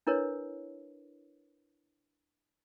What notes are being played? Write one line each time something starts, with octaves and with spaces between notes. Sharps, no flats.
D4 E4 A#4 B4 C#5